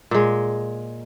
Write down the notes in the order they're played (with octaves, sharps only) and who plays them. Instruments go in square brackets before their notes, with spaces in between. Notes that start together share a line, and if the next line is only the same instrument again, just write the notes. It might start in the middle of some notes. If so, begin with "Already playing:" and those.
[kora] A#2 G#3